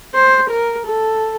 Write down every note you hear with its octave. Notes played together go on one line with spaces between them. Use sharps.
C5
A#4
A4